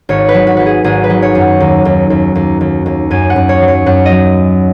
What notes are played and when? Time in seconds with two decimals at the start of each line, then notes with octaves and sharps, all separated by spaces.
0.09 G#1 C#5
0.29 B4
0.34 F#3
0.47 F#4
0.57 F#3 B4
0.66 G#4
0.84 G#1 G#4
1.04 B4
1.10 F#3
1.22 C#5
1.35 F#2
1.41 F#5
1.60 D#2
1.85 D#2
2.10 D#2
2.35 D#2
2.61 D#2
2.86 D#2
3.11 F#2 G#5
3.30 F#5
3.36 F#2
3.49 C#5
3.62 F#3
3.68 C#5
3.86 F#2 F#5
4.05 D#5
4.12 F#3